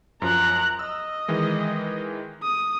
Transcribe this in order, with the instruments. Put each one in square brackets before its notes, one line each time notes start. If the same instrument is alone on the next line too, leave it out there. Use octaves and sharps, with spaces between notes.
[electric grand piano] F#2 F3 [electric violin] A#5 F#6
[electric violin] D#5 [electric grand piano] E6
[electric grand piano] D#3 E3 G#3
[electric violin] D#6